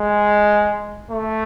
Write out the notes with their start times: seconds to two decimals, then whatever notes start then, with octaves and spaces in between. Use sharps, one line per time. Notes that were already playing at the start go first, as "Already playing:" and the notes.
Already playing: G#3
1.11 A3